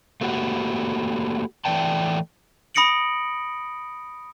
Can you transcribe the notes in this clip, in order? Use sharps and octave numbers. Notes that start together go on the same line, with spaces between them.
A3 A#3 F#4 G4
E3 A3 D5 G5 A5
B5 D#6 A#6 C#7 D7 F#7